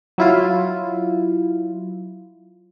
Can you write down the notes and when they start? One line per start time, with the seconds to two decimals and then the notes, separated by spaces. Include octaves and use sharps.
0.18 F#3 E4 F4